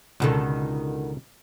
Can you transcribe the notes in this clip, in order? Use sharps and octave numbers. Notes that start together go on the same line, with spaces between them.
C#2 B2 D3 D#3 A4